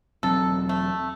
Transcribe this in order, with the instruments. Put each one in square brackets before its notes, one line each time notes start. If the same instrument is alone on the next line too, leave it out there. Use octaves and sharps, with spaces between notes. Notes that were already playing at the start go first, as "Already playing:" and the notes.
[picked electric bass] E1 F#3 C4 [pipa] A4
[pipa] A3